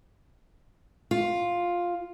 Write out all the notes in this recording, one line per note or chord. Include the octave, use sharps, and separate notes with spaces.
F4